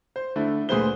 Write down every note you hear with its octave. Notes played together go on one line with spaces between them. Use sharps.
C5
D3 A3 E4
D2 A#2 G#4 B4 C5 G7